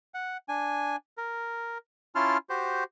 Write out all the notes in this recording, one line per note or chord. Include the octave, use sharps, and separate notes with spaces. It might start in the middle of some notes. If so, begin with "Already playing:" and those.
F#5
D4 G#5
A#4
C#4 E4 F4 A5 C6 F6
F#4 G4 C5